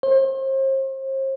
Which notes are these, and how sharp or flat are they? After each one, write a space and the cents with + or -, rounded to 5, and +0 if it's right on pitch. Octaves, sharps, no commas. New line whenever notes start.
C5 +40